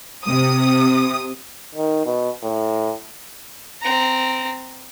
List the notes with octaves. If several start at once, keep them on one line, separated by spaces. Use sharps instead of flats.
C3 D#6
D#3
B2
A2
C4 A#5